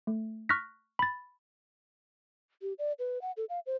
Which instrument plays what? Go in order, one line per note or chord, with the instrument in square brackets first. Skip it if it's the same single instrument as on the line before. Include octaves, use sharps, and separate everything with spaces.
[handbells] A3
C#6 F6 F#6 A#6 B6
B5 A6
[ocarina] G4
D5
B4
F#5
A4
F5
C5